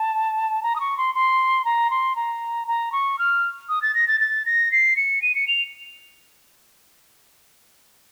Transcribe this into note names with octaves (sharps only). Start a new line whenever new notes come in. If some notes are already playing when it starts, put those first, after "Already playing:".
Already playing: A5
A#5
D#6
C#6
C6
C6
A#5
C6
A#5
A#5
C#6
F6
D#6
A6
A#6
A6
A6
A#6
C7
C#7
D#7
C#7
F7